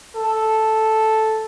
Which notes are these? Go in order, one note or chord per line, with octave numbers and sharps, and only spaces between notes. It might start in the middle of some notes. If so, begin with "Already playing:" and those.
A4